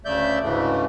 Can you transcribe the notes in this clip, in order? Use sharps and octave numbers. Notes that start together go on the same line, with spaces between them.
D2 C#3 A3 D5 E5 G6
D2 G#2 C#3 E3 A3